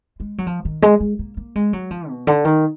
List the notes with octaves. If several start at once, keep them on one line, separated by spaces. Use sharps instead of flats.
G#3
F#3
F3
D#3
G#3
G#3
A#3
A#3
G#3
F#3
F3
B2
D3
D#3